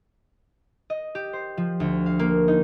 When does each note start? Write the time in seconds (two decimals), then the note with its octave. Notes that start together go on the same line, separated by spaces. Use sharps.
0.90 D#5
1.15 G4
1.33 C5
1.57 F3
1.80 D2
2.06 F5
2.19 A#3
2.48 D#4